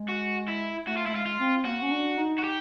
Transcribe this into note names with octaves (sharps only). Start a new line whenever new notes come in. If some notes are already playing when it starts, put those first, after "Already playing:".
Already playing: G#3
F#4
E4
A3 F#4
F4
A3 E4
G#3 F4
F4
C4
A#3 F#4
C#4
D4
D#4
F#4
G4